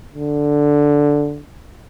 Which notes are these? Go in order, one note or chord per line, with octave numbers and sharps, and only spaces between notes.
D3